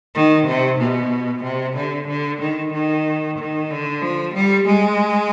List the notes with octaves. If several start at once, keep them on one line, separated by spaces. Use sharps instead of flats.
D#3
C3
B2
C3
D3
D3
D#3
D#3
D#3
D3
F3
G3
G#3